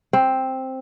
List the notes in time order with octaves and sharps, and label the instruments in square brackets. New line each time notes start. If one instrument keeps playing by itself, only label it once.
[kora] C4